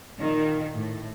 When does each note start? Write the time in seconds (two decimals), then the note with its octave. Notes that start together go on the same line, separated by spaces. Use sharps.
0.20 A#2 D#3
0.74 A2